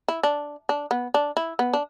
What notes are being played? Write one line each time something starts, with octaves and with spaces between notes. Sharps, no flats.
E4
D4
D4
B3
D4
E4
B3
D4